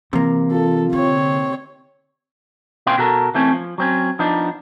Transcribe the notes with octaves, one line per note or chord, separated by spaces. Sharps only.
C3 E3 A#3
F4 A4
D3 C4 C#5
A#2 C#4 B4 F5 G5 C6
B2 F#4 A4 A#4
E3 A3 C4 C#4
F3
F#3 C4 C#4
F3 B3 D4 D#4